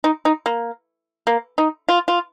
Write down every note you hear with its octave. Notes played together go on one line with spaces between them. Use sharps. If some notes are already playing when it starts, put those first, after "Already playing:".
D#4
D#4
A#3
A#3
D#4
F4
F4